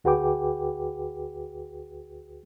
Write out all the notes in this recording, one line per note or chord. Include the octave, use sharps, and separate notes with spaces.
D2 F#4 G#4 B4 G5 D6